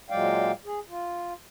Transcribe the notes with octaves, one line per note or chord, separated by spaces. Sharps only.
A#2 F#3 G#3 D5 F5 G5
G#4
F4